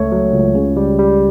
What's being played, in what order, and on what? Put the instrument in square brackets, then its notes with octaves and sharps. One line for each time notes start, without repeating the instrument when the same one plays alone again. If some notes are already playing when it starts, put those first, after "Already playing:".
Already playing: [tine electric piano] C#2 A3 C#5
F#3
C#2
C#3
G3
G3